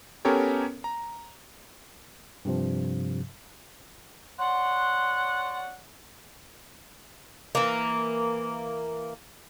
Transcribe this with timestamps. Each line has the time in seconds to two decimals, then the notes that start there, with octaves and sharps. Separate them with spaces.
0.25 B3 C#4 G4 A4 A#4 C#5
0.84 A#5
2.45 G2 C3 F3
4.39 C#5 D5 F#5 C6
7.55 E3 A#3